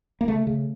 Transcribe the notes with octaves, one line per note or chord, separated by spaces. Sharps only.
A#3
C#3 A3
C#3